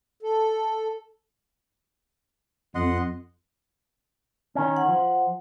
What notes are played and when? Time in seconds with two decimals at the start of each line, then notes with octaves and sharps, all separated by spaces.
0.23 A4
2.75 F2 D#5 F#5 C6
4.55 D#3 C#4
4.77 F#5
4.88 F3